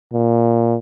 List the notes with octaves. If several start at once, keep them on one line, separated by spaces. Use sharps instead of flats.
A#2